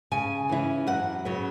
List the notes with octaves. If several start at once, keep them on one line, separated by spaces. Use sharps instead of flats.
C#3 G#5
E3 C#4 E4
F#2 F#5
C#3 F#3 B3